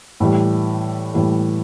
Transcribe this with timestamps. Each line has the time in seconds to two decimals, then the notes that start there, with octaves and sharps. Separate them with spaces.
0.20 A2 E3 G3
1.14 A2 E3 G3